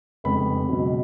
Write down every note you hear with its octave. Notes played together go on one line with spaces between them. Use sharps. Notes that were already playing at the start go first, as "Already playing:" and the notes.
F1 F2 C#3 G#3 B3 B5
C#2 B2 F#3